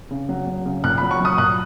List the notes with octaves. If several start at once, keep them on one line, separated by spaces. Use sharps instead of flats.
C#3
F#3
F#3
C#3
A#2 F#6
F#3 B5
C#6
F#3 D#6
A#2 F#6